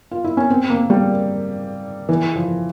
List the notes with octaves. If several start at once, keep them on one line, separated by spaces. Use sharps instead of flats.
F4
E4
C#4
C4
A#3
G3
E3
F3